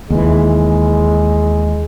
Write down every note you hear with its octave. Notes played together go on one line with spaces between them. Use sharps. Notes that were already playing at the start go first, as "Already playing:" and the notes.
D#2 E3 G#3